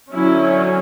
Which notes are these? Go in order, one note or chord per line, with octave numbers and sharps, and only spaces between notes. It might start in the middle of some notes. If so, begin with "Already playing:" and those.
D3 F#3 C#4 E4